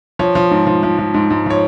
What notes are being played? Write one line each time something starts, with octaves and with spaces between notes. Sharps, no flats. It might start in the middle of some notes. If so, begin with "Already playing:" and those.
F3 C#5
F3
G#2
F3
F3
F3
G#2
G#2
F3 C#5